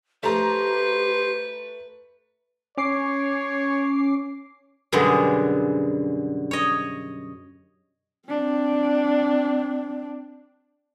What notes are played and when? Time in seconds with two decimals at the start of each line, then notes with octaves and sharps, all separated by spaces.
0.23 A3 G4 B4 C5 A#5
2.78 C#4 C#5 D6 C7
4.92 F#2 B2 D3 G3 G#3
6.51 C#5 D#5
8.28 C4 D4